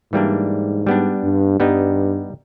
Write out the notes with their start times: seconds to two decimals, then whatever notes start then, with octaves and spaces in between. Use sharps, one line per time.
0.12 G#2 E3 G3 A#3 D4
0.87 G3 B3 D4
1.23 G2
1.60 G2 G3 B3 D#4